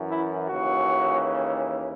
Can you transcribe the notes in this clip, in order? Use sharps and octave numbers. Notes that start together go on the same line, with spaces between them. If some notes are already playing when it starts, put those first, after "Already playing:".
Already playing: F#2 E3
E4
D#2 C#3 E3 F#4